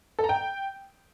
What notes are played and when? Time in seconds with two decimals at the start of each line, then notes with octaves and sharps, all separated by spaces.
0.19 A4
0.24 A#5
0.29 G5